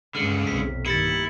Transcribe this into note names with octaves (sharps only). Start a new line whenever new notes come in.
C#2 G2 D3 G#4 F6
B1 F2 C3 B6
G2 A#2 D#3 E4 G4 A6 A#6 C#7